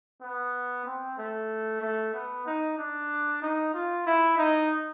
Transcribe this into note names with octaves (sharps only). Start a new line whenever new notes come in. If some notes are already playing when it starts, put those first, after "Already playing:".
B3
C4
A3
A3
B3
D#4
D4
D#4
F4
E4
D#4